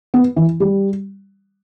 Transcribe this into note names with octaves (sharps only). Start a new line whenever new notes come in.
B3
E3
G3